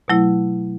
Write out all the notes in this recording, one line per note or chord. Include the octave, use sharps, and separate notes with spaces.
B2 F#3 A3 E4